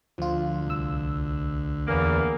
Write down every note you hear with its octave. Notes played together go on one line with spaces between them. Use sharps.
D2 F3 F4
C2 E6
E2 E3 A#3